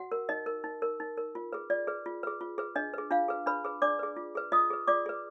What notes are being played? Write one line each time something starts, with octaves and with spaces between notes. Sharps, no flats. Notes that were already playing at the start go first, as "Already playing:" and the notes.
Already playing: F#4 F#5
A#4
D#4 D#5
A#4
D#4
A#4
D#4
A#4
F4
G#4 B4
F4 D5
G#4 B4
F4
G#4 B4
F4
G#4 B4
D4 D#5
G#4 B4
D4 F4 F5
G#4 B4
D4 B4 B5
G#4 B4
D4 D5 D6
G#4 B4
F4
G#4 B4
F4 D#5 D#6
G#4 B4
F4 D5 D6
G#4 B4